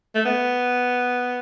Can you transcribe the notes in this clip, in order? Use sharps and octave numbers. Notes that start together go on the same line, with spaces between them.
A3
B3